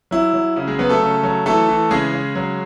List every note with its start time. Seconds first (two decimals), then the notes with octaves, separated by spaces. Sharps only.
0.11 F#3 E4
0.34 F#3
0.56 C#3 E4
0.67 G#3 G#4
0.79 F#3 B3 B4
0.89 A3 A4
1.02 C#3
1.23 F#3
1.46 E3 A3 A4
1.69 E3
1.90 C#3 G#3 G#4
2.12 C#3
2.36 F#3